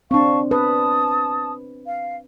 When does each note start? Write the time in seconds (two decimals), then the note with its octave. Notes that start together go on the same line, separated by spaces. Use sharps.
0.11 C4 D4 F5 A5 C#6
0.51 B4 A5 D#6
1.86 F5